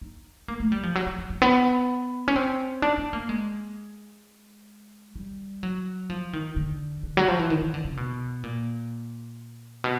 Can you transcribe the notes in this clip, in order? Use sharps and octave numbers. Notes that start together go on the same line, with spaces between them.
D#4
A#3
A3
G3
F3
F#3
F#3
F#3
F#3
B3
C#4
C4
D4
D4
A#3
G#3
G3
F#3
F3
D#3
D3
D3
F#3
F3
E3
D#3
D#3
D3
C#3
B2
A#2
B2